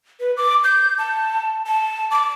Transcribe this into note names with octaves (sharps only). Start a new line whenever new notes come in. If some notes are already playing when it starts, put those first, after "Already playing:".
B4
D6
G6
A5
A5
D6